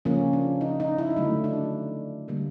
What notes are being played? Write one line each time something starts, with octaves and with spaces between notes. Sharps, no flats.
C#3 F3 A#3 C#4
D4
D#4
D#4
E4
D4
D3 F#3 A3 D#4
D4
D3 G3 A#3